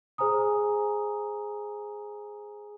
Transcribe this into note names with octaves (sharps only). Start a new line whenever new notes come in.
G#4 C5 G#5 A#5 D#6